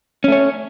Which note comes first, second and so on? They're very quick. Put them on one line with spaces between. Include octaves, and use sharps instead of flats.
C#4 A3 C#5